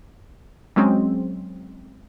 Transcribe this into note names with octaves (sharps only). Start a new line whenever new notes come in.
F#3 G#3 C4 C#4